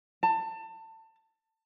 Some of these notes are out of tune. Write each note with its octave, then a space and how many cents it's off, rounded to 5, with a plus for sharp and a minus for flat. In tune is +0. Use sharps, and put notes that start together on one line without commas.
A5 +25